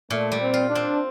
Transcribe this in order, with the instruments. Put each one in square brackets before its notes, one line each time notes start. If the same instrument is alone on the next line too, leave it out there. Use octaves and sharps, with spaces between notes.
[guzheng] A#2 [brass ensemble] A3
[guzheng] G3
[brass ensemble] C4
[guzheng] F4
[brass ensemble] D4
[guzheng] C4